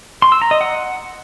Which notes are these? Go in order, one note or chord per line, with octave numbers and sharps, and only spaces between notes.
C6
E6
A#5
D#5
F#5